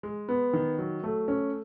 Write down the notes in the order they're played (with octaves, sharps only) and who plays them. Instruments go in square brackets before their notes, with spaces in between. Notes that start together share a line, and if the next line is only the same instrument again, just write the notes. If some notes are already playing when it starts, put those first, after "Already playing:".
[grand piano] G#3
B3
D#3
F#3
A3
C#4